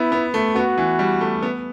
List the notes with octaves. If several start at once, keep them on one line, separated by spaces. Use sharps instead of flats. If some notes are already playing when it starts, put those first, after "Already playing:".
Already playing: B3 E4
B3
A3
B3 F#4
E3
G3
A3
B3